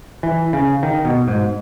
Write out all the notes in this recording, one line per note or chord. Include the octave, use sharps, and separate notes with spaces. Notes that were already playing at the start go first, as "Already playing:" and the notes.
E3
C#3
D#3
B2
G#2